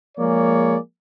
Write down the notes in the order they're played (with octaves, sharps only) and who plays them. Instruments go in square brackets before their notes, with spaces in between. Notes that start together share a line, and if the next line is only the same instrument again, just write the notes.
[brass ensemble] F3 G#3 A#3 G#4 C#5 D5